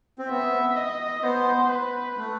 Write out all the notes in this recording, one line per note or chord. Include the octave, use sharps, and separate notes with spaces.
C4
B3 E5
D#5
B3 C5
B4
A3